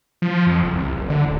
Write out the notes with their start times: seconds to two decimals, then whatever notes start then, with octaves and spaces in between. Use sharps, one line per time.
0.22 F3
0.47 F2
0.63 F#1
0.76 C2
0.97 F#1
1.10 D3
1.25 D1